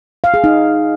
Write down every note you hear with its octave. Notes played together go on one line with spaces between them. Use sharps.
F5
G#4
D#4